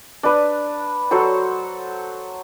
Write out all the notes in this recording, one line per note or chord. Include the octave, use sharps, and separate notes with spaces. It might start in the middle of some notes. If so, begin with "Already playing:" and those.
D4 B4
F#3 A4 C5 C#6